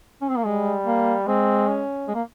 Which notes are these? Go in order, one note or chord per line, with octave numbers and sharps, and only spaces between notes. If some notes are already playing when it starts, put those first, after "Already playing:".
C#4
C4
A#3
G3 G#3
A#3
G#3 C4
C#4
G#3
A#3